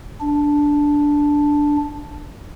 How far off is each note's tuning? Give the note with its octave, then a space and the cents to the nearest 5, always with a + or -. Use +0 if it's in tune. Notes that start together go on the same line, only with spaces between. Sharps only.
D4 -5